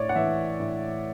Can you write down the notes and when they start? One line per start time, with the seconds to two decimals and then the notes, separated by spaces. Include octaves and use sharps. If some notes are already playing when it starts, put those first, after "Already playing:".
Already playing: A2 C#5 D5
0.09 F#5
0.16 E3 E5
0.60 A2